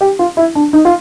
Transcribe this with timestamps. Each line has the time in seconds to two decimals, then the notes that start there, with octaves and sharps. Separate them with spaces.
0.01 G4
0.19 F4
0.37 E4
0.55 D4
0.73 D#4
0.85 F4